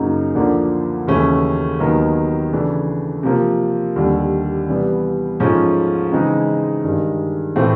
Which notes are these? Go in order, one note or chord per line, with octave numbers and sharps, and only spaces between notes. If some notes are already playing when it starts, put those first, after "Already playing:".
Already playing: F#2 C#3 F#3 A#3 D#4
D2 D3 F3 A#3 D4
D#2 C#3 E3 A3 C#4
D#2 D#3 F#3 B3
C#3 E3 A3 D4
C3 F3 A#3
D#2 D3 G3
C3 E3 G3 B3
G#2 F3 A3 C#4
C#3 E3 G#3 C4 D#4
G2 D#3 G#3
A2 E3 A3 C4 E4